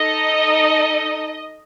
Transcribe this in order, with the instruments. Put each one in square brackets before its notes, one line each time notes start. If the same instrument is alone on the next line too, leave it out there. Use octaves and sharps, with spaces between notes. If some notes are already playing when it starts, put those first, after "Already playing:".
Already playing: [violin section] D#4 A4 D#5